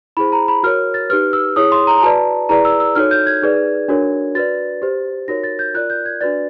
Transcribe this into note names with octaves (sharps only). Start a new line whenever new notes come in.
E4 G#4 C5 B5
A#5
B5
F#4 A#4 C#5 F6
A6
D#4 G4 B4 F6
E6
E4 G#4 C#5 D#6
C6
A#5
A#5
F#4 B4 D5 A5
E4 G#4 B4 D5 A#5
E6
E6
D#4 F#4 A4 C#5 F6
G6
G#6
D#4 G#4 B4 D5
D4 F#4 A#4 C#5
F#4 B4 D5 A6
G4 C5
D#4 F#4 A#4 C#5 A#6
A6
G6
F4 A#4 D5 F#6
G6
G#6
D4 F#4 B4 D5 A6